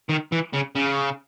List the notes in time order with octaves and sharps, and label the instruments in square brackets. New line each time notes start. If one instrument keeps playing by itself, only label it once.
[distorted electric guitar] D#3
E3
C#3
C#3